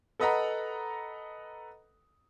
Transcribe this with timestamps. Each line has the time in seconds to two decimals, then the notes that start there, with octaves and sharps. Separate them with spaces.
0.20 A4 B4 D#5 F#5 A#5 B5